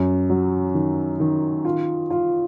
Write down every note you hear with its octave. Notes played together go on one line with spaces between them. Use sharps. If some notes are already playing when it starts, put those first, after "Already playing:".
Already playing: F#2
F#3
D#3
D#3
F4
F4